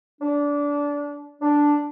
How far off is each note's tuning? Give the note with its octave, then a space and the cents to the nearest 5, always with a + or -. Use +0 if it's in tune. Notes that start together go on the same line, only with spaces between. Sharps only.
D4 -20
D4 +0